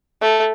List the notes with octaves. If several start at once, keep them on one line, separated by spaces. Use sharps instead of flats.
A3